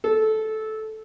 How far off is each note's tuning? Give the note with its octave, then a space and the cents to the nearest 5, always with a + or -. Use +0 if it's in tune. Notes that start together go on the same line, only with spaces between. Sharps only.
A4 -15